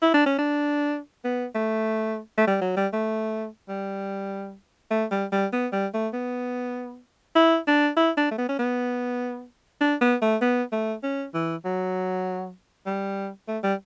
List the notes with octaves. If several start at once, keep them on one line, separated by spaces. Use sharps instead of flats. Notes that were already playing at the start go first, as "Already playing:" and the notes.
E4
D4
C#4
D4
B3
A3
A3
G3
F#3
G3
A3
G3
A3
G3
G3
B3
G3
A3
B3
E4
D4
E4
D4
A3
B3
C#4
B3
D4
B3
A3
B3
A3
C#4
E3
F#3
G3
A3
G3